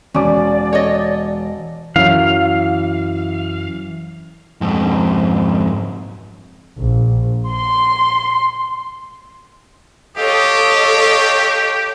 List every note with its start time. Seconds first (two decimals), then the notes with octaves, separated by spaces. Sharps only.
0.14 E1 C#4 D5 D6
0.73 C#5 D#5
1.96 F#2 E3 F#3 F5
4.61 F2 G#2
6.78 A#1
7.50 C6
10.18 G4 A4 C#5 D#5 F5